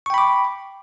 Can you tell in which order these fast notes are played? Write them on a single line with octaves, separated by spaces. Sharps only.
C#6 G5 B5 D6